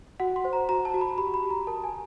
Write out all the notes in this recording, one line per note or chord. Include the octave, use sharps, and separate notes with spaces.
F#4 F#5
C6
C5
A#5
F#4 A#5
A5
F#4
B5
G4 B5
B5
G4
A#5
A#4 A5
G#5